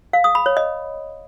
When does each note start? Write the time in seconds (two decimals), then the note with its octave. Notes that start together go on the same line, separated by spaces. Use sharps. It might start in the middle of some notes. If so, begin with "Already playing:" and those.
0.13 F5
0.24 D#6
0.35 B5
0.46 C#5
0.57 D#5